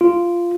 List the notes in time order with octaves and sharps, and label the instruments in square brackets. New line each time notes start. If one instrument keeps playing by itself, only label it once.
[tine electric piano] F4